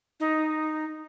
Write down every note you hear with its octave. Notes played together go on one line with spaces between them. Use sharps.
D#4